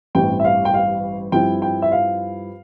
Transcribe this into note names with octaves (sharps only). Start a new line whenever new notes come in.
A1 G2 E3 G3 C4 G5
E5
F5
G5
F5
G2 F3 C4 E4 G5
G5
E5
F5